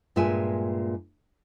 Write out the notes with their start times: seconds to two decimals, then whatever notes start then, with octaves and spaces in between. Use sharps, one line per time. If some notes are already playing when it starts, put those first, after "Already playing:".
0.16 G2 A#2 G#3 F4 E5 G#5